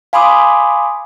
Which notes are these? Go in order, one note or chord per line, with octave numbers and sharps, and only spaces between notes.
F5 G#5 B5 C6 D6 D#6